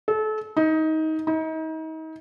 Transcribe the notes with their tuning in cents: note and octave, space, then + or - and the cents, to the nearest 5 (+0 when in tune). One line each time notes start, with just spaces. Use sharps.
A4 -30
D#4 +20
D#4 +35